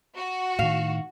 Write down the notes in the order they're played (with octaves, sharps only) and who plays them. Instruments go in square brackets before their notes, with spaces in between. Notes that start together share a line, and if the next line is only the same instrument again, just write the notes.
[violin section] F#4
[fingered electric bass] A2 D#3 [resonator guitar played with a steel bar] F5